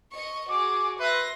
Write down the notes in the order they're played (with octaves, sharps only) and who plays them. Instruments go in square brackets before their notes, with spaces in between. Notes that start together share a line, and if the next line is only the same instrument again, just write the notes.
[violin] D#5 C#6
[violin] F#4 G#4 [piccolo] D6
[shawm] B4 [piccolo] E5 [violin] C6 A#6